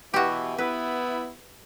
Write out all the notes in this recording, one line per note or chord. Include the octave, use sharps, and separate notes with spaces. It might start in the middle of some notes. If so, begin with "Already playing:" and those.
B2 E3 F#4 G4
B3 E4 B4